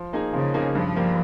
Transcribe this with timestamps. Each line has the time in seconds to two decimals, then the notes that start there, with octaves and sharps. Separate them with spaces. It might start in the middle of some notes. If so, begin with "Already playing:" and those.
Already playing: F3
0.13 A#3 D#4 G#4
0.33 C#3 F3
0.54 A#3 D#4 G#4
0.75 G2 F3
0.96 G3 A#3